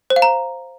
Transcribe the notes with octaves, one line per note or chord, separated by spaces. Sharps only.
C5
F5
A#5